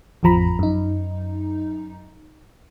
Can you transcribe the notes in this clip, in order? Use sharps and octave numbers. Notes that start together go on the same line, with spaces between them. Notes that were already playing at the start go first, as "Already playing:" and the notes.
A1 F2 F3 A#5 B5
F#2 D#4